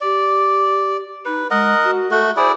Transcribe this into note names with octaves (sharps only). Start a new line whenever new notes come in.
G4 D5
D#4 B4
G#3 A#4 D#5 F#5
F#4
A3 F#4 A4
E4 G#4 C5 D5